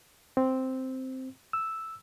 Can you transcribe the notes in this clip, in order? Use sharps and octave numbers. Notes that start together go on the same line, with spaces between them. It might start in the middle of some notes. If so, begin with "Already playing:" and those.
C4
E6